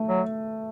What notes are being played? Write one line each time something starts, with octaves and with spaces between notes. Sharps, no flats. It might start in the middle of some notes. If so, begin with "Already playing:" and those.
Already playing: A3
F#3